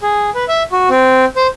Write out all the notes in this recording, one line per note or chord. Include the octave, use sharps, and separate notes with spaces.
G#4
B4
E5
F#4
C4
C5